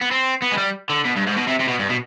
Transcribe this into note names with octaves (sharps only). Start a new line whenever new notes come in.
B3
C4
B3
G#3
G3
D3
B2
G2
G#2
B2
C3
C3
B2
G2
B2